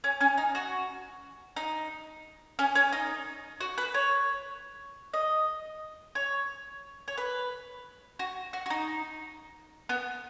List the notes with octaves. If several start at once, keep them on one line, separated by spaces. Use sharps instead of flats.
C#4
C#4
D#4
F#4
D#4
C#4
C#4
D#4
F#4
B4
C#5
D#5
C#5
C#5
B4
F#4
F#4
F#4
D#4
B3